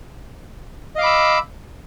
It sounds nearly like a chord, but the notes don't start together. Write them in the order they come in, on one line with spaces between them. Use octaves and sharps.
D#5 F5 D6 B5 E6